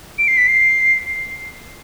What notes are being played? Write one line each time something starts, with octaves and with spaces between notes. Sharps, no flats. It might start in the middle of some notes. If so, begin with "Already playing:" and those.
D7
C7
B6
C7